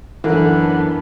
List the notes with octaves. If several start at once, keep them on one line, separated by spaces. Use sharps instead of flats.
F#2 D3 E3 B3 D4 A#4